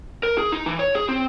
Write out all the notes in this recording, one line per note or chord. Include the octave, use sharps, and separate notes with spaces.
A#4
G#4
D#4
E3
C#5
G#4
C4